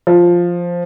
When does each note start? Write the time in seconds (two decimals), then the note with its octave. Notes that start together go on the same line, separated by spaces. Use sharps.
0.07 F3